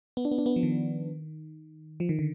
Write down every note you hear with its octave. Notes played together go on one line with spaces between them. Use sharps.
B3
D4
B3
D4
B3
F3
D#3
F3
D#3
D3